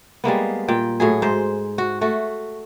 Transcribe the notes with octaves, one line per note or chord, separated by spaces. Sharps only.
G3 G#3 A#3 B3
A#2 G5
A2 F#3 G#4
G#2 C5
F#4
A3 F#4